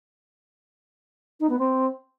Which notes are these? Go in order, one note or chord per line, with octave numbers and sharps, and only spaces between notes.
D#4
B3
C4